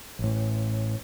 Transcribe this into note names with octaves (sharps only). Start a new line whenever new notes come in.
A1 A2